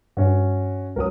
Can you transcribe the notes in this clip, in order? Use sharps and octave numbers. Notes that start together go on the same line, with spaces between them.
G2 C#4 F#4
C#2 F#3 A#4 D#6